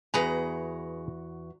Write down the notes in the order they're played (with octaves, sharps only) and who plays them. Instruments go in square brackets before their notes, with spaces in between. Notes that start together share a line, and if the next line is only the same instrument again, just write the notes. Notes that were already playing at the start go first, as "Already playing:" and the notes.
[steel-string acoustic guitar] E2 F#4 A#5 [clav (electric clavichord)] G#4 B4 G#5